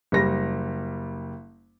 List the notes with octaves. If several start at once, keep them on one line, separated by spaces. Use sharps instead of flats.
F#1 G3 A#6